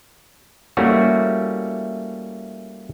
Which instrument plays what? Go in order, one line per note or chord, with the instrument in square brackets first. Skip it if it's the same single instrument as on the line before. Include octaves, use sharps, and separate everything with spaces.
[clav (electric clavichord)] G3 A3 A#3 C#4 E4 F#4